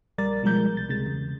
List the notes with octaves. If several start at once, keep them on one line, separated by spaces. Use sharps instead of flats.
A#1 G3 A#4 D5 A6
B2 F3 G3 G#3 A#4 G6
C2 A6
C#2 C3 G#3 A6
E2 C#3